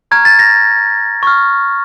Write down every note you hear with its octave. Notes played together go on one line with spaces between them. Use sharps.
A#5 C#6 F6 G#6
A6
A#6
C#6 F6